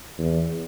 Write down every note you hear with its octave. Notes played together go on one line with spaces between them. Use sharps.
E2